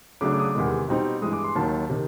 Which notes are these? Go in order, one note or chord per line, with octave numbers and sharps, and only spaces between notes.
C#3 F#3 A3 D4 D6
D6
D#6
D6
E2 C3 D#3 G#3
B2 G3 C4 D#4
G2 E3 G#3 D#6
D6
C6
D#2 D#3 F#3 A5
C3 D#3